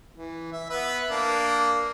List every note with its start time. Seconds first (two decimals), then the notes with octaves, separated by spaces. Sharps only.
0.15 E3
0.52 E5
0.70 B3 B4 E5
1.10 A#3 D4